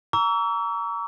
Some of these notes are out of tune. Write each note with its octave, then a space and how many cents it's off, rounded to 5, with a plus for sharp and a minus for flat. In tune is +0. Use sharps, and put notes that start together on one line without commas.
A#5 +0 C#6 +45 E6 +0